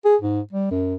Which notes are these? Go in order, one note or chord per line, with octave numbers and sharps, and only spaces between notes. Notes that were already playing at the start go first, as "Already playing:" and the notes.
G#4
G#2
G3
F#2